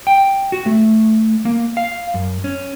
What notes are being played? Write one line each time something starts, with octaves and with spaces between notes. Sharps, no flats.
G5
F#4
A3
A#3
F5
F#2
C#4